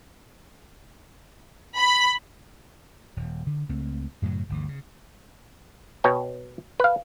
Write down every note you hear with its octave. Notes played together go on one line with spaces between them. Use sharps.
B5
D#1
D3
C#2 A3 C4
F#2 A2 C#3 F#3
G1 D2 E3
C#3
B2 C#5 G5
B4 F5